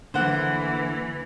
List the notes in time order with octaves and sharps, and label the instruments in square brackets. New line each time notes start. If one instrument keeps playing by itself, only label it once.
[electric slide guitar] D3 A#3 [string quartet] E3 [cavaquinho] C5 F#5